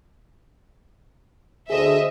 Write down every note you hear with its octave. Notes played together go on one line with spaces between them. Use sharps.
D2 D3 G#4 A4 C5 D#5 E5